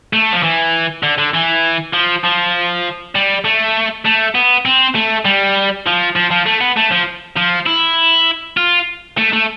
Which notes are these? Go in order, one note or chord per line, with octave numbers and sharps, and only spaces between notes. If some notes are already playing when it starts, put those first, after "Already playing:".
A3
F3
E3
D3
D3
E3
F3
F3
G3
A3
A3
B3
C4
A3
G3
F3
F3
F3
A3
B3
A3
F3
F3
E4
F4
A3
A3